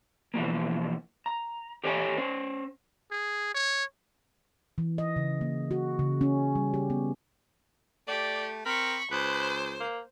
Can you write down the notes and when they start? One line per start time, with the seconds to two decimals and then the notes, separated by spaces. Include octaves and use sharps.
0.34 B2 E3 F3 A#3
1.26 A#5
1.84 G4 A4 C#5 D#5 G5 G#5
2.17 C#4 C5
3.11 G#4
3.54 C#5
4.78 E3
4.98 D#5
5.16 C#3
5.41 A#3
5.71 F#4
5.99 C#3
6.21 C#4
6.55 G3
6.74 G4
6.90 B3
8.08 A3 G4 D5
8.66 C4 A#4 B5 C#6
9.11 C#2 B4 C5
9.80 A#3